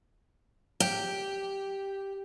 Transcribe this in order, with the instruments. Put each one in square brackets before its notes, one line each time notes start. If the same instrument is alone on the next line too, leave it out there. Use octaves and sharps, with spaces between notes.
[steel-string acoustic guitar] G4